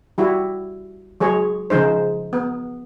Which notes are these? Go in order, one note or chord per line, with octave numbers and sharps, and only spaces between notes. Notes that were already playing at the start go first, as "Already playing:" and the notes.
G3 E4 F#4
F#3 G#3 G#4 C#5
C#3 F3 G#3 D#4 C5
B3